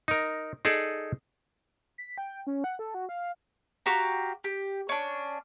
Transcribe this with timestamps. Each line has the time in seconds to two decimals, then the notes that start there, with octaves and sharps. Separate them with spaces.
0.08 D#4 A#4
0.65 D#4 G#4 A4 D5
1.98 B6
2.18 G5
2.47 C#4
2.64 F#5
2.79 A4
2.94 F#4
3.09 F5
3.86 F#4 G4 F5 A#5
4.44 G4
4.89 C#4 D4